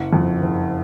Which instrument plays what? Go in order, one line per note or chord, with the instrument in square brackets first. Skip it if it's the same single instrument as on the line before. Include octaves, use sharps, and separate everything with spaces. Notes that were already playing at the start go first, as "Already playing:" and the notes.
Already playing: [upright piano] F#1 F#5
F2
F#1